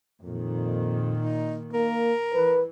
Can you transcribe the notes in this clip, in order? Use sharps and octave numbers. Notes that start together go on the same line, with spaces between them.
F2 A#2 D#3
D#4
A#3 A#4
E3 B4